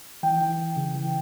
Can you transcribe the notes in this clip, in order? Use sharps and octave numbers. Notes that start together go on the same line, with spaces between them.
E3 G5
E3
E3
C#3
E3